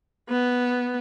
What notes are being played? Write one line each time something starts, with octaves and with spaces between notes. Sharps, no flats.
B3